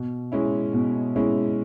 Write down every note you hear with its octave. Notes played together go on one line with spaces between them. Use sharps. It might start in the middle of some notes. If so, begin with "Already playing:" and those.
Already playing: B2
G#3 C#4 E4
B2
G#3 C#4 E4